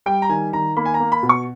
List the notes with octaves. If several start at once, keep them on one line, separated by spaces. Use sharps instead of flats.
G3 G5
A#5
D#3 G#5
D#3 A#5
A#3 B5
G#5
A#5
A#3
B5
B2
C#6